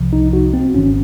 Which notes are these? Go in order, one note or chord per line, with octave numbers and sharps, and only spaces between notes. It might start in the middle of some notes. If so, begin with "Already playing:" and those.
Already playing: C2 C3 F3
D#4
F#4
C4
G#1 G#2 D#3 C#4